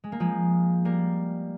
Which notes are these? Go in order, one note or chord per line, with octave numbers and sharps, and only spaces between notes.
G#3
A#3
F3 G#3
G3 A#3